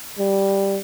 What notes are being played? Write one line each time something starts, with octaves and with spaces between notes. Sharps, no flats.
G3